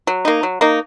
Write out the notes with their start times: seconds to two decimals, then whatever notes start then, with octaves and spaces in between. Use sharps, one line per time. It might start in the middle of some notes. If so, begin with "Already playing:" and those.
0.07 F#3
0.25 A#3 D#4
0.43 F#3
0.61 A#3 D#4